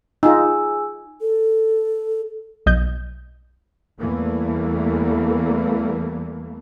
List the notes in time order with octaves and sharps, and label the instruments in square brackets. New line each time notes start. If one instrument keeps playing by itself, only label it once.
[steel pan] D#4 F4 [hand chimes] G#4 G#5 E6
[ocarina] A4
[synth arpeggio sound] B1 D#5 G6
[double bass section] E2 E3 G3 A3 A#3